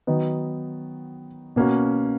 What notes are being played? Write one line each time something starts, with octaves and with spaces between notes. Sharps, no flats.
D#3 F#3 B3 D#4
B2 A#3 C#4 F#4